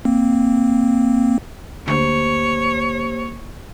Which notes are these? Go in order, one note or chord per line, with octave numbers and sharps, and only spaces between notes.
A#3 C4
D2 A#3 G4 C5 C#5